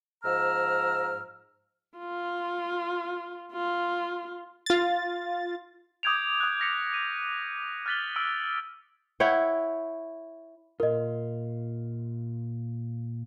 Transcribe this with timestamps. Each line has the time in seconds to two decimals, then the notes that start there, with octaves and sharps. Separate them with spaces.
0.23 G#2 F3 A#5 E6 F6
1.98 F4
3.52 F4
4.66 F4 A6
6.03 D6 D#6 G6 G#6 D7 F7
6.40 D#6 F#6
6.60 F6 A#6 B6 C#7
6.94 D#7
7.86 F6 F#6 A6 B6 F#7 G7
8.16 E6 F6 D7
9.20 E4 C#5 F#5 G5
10.80 A#2 F4 A#4 D#5